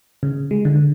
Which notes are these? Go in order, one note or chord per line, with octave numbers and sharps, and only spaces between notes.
C#3
G#3
D3